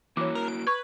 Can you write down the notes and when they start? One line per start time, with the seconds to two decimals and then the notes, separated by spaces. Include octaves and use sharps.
0.17 E3 A#3 E4 F#4 C#5 D6
0.35 A#4
0.48 D7
0.67 B4 C#6 G#6